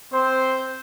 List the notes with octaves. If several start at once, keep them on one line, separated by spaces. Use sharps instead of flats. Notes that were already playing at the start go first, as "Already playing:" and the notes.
C4 C5